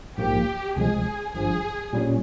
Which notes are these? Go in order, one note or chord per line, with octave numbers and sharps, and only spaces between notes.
A#1 G#2 F3 A#3 G4
C#2 C3 F3 G#3 G#4
G#1 G2 F3 G#4
A#2 G3 C#4